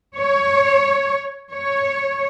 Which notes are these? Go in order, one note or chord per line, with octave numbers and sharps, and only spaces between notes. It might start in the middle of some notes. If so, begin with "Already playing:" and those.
C#5
C#5